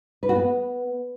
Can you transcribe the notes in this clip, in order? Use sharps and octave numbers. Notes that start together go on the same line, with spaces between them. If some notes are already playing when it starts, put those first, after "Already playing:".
B4
F#4
B3